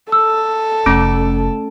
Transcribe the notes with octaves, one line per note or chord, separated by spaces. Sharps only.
A4 E6
F1 A3 C#4 D7